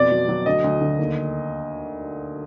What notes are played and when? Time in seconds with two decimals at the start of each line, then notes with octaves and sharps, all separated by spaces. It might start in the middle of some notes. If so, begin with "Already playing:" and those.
Already playing: F2 B2 D5
0.11 F#3
0.29 F#3
0.46 D2 D#5
0.64 D2
0.81 D3
0.99 D#2